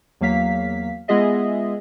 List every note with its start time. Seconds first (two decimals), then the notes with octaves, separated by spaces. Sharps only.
0.21 E2 F#3 A#3 F5 B6
1.08 G#3 B3 F4 G#4 D#5 E5